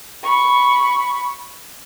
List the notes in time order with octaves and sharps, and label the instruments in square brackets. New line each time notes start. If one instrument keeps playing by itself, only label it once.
[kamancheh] B5 C#6